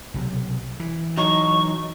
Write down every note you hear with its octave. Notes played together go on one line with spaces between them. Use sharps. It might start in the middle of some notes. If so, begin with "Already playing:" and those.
B1 C3 F#3
E3
F#3 D#4 C#6